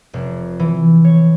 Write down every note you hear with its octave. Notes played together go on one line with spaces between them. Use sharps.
F1
E3
C#5